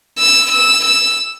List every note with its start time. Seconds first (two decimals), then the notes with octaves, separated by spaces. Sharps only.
0.18 E6
0.51 E6
0.84 E6